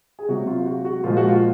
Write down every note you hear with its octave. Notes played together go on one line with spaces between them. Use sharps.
G#4
C3 F#3 F#4
F4
F#4
F#4
A#2 F3 G#3 F4
F#4
F4